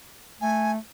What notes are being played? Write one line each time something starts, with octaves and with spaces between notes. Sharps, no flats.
A3 G#5